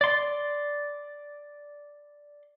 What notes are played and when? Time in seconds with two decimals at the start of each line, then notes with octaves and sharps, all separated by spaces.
0.01 D5 C6